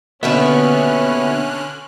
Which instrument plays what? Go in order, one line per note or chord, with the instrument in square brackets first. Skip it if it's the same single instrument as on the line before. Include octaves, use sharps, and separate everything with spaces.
[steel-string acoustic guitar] D#2 B2 E5 [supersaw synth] D3 F6 F#6 [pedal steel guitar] B3 [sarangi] C#4